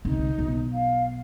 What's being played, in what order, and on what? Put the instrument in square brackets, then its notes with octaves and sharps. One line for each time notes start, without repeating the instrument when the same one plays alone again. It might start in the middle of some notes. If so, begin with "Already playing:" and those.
[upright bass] C2 D3 [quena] D#4
[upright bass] B1
[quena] F5